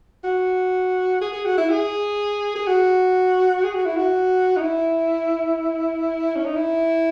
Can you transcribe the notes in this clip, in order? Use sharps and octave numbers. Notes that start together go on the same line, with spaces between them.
F#4
G#4
G#4
F#4
E4
G#4
G#4
F#4
G#4
F#4
E4
F#4
D#4
E4
C#4
D#4
E4